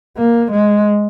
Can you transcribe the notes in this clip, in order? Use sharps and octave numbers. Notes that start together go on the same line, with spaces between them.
A#3
G#3